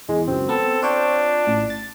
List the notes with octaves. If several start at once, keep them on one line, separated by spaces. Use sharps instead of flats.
E2 G#3
C#2 F#2 C4
B3 A4
D4 F4 C#5 G5
A1
A6